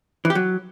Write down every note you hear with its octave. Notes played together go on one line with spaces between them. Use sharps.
E3
G4
F#3